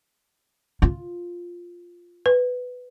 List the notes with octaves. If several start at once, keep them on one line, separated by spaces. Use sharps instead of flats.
F4
B4